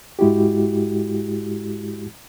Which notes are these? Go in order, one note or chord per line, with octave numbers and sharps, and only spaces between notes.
G#2 G#3 E4 F#4 G4